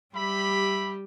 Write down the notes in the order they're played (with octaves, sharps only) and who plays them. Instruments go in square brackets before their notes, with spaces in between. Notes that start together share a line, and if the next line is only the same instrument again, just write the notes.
[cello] G3 G4 [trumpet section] E5 B5